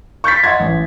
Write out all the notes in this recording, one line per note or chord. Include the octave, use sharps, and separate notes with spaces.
C#6 G6 A6 B6
D#5 E5 F#5 C6 G#6
A1